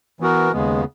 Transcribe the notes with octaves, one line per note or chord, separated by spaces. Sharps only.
E3 B3 F#4 A#4
D#2 C#3 G#3 B3